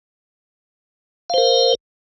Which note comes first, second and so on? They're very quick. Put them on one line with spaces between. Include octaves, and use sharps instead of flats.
F5 C5 A#4